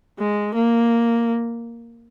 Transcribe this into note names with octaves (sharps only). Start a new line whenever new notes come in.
G#3
A#3